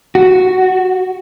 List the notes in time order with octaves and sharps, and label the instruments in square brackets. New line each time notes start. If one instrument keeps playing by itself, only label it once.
[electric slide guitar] F#4